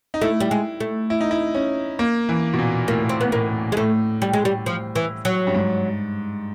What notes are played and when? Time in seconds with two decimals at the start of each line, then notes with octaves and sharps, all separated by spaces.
0.14 D#4
0.21 A3 E4
0.40 G3
0.51 G#3
0.80 A3
1.10 E4
1.21 D#4
1.31 E4
1.55 C#4
1.99 A#3
2.29 E3
2.54 B2
2.59 A#2
2.88 A2 A#3
3.09 C4
3.21 B3
3.32 A2 A#3
3.72 G#3
3.77 A2 A3
4.22 G3
4.33 G#3
4.45 G3
4.66 F3
4.95 E3
5.25 F#3
5.47 G2
5.54 G#2